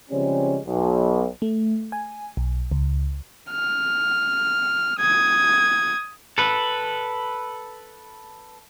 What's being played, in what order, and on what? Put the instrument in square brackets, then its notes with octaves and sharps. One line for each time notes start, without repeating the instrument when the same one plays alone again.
[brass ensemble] C#3 F3 G3 G#3 C4 C#4
B1
[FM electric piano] A3
G#5
B1
C#2
[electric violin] F6
D#6 G#6
[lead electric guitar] A4 B4